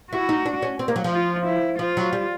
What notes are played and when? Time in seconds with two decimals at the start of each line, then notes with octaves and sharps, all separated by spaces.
0.12 E4 F#4
0.29 D#4
0.46 D4
0.62 C#4
0.79 C4
0.88 A#3
0.96 F#3
1.04 F3
1.13 F4
1.46 E4
1.79 F3 F4
1.97 F#3
2.13 G3